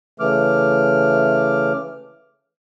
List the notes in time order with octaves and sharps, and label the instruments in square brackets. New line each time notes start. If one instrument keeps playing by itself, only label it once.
[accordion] C#3 E3 A3 D6 F6